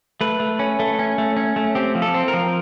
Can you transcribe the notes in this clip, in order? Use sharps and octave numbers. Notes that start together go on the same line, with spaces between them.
A3 B4
A3
C#4
A3
C#4
A3
C#4
A3
C4 G4
F3
A4
C4
A#4
F3